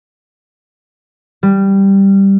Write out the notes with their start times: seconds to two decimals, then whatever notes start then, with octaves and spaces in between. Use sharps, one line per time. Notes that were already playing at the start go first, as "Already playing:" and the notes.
1.43 G3